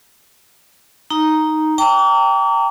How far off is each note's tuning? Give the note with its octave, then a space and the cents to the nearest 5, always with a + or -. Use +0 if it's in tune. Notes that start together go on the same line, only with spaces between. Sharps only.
D#4 +0 A#5 +0
G5 +0 A#5 -30 D6 -45